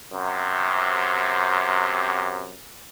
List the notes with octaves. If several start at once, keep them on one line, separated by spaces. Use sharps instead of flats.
F#2 C3